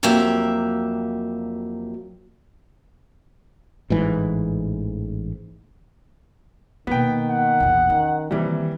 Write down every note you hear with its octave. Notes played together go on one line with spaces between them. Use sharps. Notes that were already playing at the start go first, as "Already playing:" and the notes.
F2 F#3 A#3 G4 E5
A1 G#2 E3
B2 D#3 A#3 B3 G5
F#5
A#1 E2
D#3 C#4
C3 D#3 E3 G3 A#3